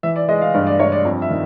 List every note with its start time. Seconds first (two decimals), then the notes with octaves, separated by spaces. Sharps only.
0.03 E3 E5
0.16 D5
0.29 G#3 D#5
0.42 F5
0.54 G2 D5
0.67 D5
0.80 G2 C#5
0.92 D5
1.05 F2
1.22 E5
1.30 D#3